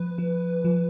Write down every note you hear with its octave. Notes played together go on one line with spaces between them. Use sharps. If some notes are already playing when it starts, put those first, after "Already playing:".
Already playing: F3 B4
F3
F3